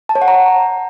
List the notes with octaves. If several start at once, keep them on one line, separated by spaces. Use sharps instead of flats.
A5
C#5
F#5
A#5